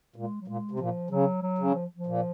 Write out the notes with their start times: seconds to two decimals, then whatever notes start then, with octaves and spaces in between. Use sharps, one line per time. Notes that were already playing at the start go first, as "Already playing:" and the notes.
0.16 A#2 G#3
0.41 F#3
0.48 A#2 G#3
0.71 C3
0.79 A#2 F3
1.10 C#3 F#3
1.42 F#3
1.58 C#3
1.74 F3
1.96 F3
2.06 A#2